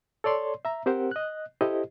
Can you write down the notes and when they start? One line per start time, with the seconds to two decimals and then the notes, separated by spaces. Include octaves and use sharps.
0.24 A4 C#5 D5 C6
0.65 E5 A#5
0.86 C4 G4 A#4 C5 F#5
1.11 D#5 F#6
1.61 E4 G4 A4 C5 D#5